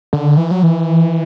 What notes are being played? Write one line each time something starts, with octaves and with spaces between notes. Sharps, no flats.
D3
E3
F#3
E3